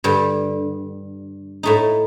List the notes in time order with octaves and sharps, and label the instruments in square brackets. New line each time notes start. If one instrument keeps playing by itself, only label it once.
[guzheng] G2 D3 G3
A2 A3 D#4